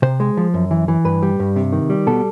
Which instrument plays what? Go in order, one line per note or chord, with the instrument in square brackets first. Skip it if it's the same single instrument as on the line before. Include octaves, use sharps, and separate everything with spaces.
[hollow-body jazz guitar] C3 C5
G#3
F3
F#2
E3
E3
G2 B4
G3
G2
C3
D#3
G3
B2 A4